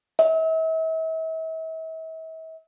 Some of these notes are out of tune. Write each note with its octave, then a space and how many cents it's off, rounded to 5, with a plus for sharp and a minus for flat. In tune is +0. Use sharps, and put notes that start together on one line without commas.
E5 -40